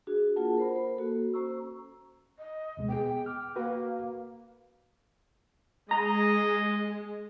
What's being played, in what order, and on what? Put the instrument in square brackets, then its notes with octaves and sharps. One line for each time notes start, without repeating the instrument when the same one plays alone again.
[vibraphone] D4 F#4 G#4
A#3 F4 G#4 A#4 F#5 A5
A#4 C5 B5
C5 B5
A#3 F#4 A4
C#4 F#4 C5 A#5 C#6 E6
[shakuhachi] D#5
[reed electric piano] D2 B2 G#3
[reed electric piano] B3 G#4 [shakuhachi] G5
[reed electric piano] D6 F6
[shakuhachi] A#3 [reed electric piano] F#4 A#4 B4
[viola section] G#3 [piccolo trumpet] D#5 [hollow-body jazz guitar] A#5